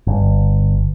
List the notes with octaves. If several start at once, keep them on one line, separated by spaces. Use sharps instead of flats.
G1